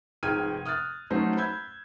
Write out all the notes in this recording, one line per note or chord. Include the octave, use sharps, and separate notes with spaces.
F1 G#2 G5 F6 G#6 D#7
D#6 F6 F#6 A6
F#3 A3 C#4 D#4 C5 F#5
B5 E6 G6 G#6